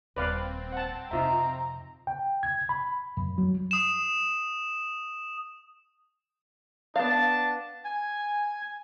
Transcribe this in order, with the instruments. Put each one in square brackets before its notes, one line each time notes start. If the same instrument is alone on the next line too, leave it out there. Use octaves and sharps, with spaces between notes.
[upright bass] D#1 [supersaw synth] C4 [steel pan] B4 D5 F5
[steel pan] F#5 A5
[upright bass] F2 C3 [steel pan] D#4 F4 E5 [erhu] A#5
[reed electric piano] G5
G#6
B5
F#2
F#3
[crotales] D#6 E7
[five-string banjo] B3 F5 [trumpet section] D4 A5
[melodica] G#5